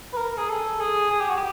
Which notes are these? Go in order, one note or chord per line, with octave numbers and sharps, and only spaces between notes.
B4
A#4
G#4
A4
G#4
G#4
G4
F#4
G4